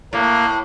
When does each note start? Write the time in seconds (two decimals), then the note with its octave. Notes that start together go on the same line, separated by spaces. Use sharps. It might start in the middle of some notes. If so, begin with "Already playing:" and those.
0.13 A2 A#3